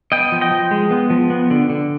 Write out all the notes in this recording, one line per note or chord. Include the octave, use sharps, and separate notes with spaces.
B3 D#5 G5
F3
D#5 G5
F3
G#3
B3
F3
B3
D3
D3